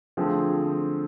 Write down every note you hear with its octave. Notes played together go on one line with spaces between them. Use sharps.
D3 F3 A3 C4 G#4